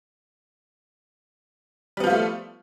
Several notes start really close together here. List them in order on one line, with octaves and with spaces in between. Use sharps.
G3 B3 F3 F4 A3